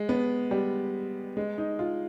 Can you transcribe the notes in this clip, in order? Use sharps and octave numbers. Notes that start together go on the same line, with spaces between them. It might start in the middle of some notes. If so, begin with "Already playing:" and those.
Already playing: G#3
B3
G3
G#3
D#4
F4